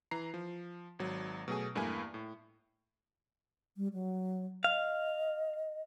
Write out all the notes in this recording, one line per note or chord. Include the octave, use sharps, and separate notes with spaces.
E3 A#5 C7
F3
G#1 F#3
B2 F#3 A3 G#4 G#5
E2 G2 A3 A#3 E4 G#5
A2
G3
F#3
D#5 F5